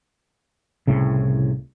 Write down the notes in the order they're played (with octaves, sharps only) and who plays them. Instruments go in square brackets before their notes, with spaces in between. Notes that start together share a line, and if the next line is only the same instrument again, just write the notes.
[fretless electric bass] C2 A2 C#3